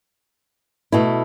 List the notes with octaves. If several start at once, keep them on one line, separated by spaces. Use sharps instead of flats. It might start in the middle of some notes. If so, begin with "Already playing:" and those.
B2 A3 E4